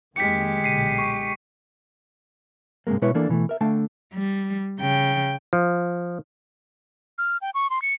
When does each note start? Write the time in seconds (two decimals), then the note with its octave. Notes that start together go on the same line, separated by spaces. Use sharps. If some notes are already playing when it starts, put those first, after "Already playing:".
0.16 F2 D#3 G#3 A#3 G4 B6 C#7
0.64 B1 A#2 D3 C7 D#7
0.99 C#6
2.87 G2 C3 D#3 G#3 A#3
3.02 B2 G#3 E4 B4 C#5
3.14 E3 A#3 D4 A4
3.29 B2 E3 G#3 A3
3.49 A#4 E5
3.61 D3 A3 F5 G5 A5
4.13 G3
4.80 C#3 G5
5.53 F3
7.18 F6
7.42 G5
7.54 C#6
7.70 C6
7.82 C#7